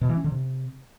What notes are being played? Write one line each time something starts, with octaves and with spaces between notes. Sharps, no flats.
B2
E3
C#4
D3
C3